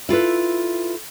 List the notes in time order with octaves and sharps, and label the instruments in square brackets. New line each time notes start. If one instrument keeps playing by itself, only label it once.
[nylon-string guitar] E4 F4 A4 B4